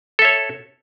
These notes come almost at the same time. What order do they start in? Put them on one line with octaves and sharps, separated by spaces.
A4 E5 C#5